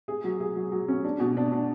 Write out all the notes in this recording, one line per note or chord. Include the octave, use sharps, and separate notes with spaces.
G#4
F#3
G#4
F#3
F#3
C#4
D4
B2
D4
D4